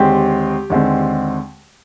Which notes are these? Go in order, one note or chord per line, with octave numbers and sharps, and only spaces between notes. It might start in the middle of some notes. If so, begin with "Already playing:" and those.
Already playing: D#2 D3 G#3 C4 G4
D#2 D3 G#3 C4